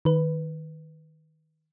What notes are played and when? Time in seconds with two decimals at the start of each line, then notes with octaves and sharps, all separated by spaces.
0.05 D#3 B4